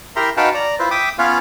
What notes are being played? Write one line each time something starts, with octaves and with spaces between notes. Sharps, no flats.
E4 G4 A#4 E5 A#5 C6
D#4 F#4 B4 F5 G5 A5
D5 A#5
E4 F4 B4 C5
E5 G5 D6 D#6
B3 C#4 F4 B4 C#5 F5